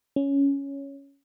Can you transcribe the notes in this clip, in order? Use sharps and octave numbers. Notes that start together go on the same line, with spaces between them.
C#4